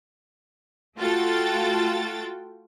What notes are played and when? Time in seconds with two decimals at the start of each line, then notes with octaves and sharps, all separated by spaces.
0.97 A3 F4 F#4 A4 G5 A6